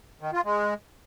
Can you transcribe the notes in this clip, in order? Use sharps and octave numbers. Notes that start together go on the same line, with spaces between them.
D#3
F4
G#3